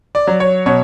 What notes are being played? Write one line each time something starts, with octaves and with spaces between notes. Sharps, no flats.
D5
F#3
C#5
B2 C#5